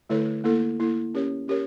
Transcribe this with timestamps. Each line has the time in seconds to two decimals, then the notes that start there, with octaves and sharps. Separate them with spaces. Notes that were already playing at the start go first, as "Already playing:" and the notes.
0.10 D3 A3 E4 A4 C#5
0.44 A#3 E4 A4
0.80 A#3 E4 A4
1.14 C#4 G4 A#4 C#5
1.48 C#4 G4 A#4 C#5